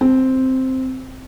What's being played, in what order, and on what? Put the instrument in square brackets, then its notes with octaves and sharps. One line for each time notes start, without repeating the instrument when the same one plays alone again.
[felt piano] C4